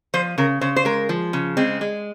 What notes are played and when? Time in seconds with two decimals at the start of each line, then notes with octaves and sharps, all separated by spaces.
0.14 F3 C5
0.38 C#3 A#4
0.61 C#3 C5
0.76 C5
0.85 G#3 A#4
1.09 F3
1.33 C#3
1.57 G#3 C4
1.81 G#3